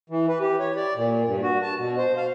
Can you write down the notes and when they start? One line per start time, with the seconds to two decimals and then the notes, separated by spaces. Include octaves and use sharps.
0.09 E3
0.29 B4
0.40 G4
0.60 C#5
0.76 D5
0.95 A#2
1.26 G2
1.42 F#4
1.62 A5
1.78 B2
1.97 C5
2.17 F5